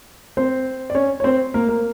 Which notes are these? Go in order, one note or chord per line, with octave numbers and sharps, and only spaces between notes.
C4 C5
D5
C#4 C#5
C#5
C4 C5
A#3 A#4
A#3 A#4